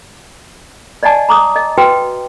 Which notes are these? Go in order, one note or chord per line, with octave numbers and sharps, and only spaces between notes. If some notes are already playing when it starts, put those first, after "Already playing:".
D5 D#5 F#5 G#5 A5
A#5 D6 D#6
D#5
F#4 B4 G5